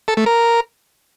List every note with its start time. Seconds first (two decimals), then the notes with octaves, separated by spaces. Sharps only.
0.08 A4
0.17 A3
0.26 A#4